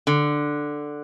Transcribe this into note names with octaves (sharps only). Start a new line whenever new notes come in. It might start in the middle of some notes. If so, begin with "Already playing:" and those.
D3